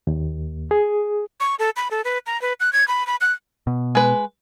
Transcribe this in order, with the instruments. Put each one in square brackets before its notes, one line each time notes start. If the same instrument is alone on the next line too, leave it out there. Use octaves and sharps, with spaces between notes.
[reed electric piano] D#2
G#4
[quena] C#6
A4
B5
A4
B4
A#5
B4
F#6
G#6
B5
B5
F#6
[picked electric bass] B2
[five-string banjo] G#3 B4